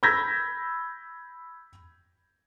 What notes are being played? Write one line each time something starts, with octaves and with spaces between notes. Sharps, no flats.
B5 E6 G6 G#6 A#6 B6